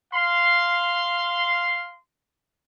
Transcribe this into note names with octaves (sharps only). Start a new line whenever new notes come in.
F5 C6